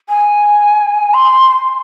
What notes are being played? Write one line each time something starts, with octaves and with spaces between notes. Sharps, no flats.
G#5
C6